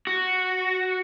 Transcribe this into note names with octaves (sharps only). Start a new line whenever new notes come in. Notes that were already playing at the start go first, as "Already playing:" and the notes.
F#4